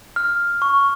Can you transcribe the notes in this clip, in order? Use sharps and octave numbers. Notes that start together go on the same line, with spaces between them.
F6
C#6